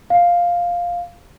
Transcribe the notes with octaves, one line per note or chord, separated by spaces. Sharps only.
F5